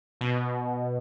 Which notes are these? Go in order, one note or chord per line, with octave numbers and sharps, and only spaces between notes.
B2